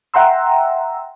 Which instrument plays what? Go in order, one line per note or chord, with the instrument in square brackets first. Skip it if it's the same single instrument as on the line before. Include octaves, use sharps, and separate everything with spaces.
[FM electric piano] E5 F#5 G5 A#5 C6 E6